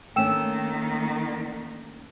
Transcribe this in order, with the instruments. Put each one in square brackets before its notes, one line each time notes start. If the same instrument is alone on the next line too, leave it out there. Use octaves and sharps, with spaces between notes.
[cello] D#3 A#3 [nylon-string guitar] A3 C#4 D4 [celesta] G5 E6 E7